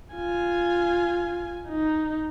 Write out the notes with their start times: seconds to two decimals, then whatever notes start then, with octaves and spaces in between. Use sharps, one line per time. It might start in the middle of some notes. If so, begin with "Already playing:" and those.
0.15 F4 G#5
1.68 D#4